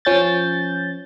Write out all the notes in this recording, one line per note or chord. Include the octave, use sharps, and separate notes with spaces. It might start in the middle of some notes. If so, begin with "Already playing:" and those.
F3 C#4 G6 A6